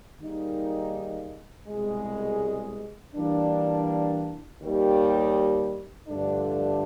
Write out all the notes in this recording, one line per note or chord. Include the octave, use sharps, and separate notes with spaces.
D#3 G3 A#3 D#4 G#4
C2 B2 G#3
E3 G3 A#3 D4
D#2 D#3 G3
G2 D3 F3 A3 D4